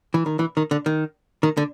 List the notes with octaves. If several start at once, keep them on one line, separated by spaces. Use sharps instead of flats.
E3
D#3
E3
D#3
D3
D#3
D#3
D3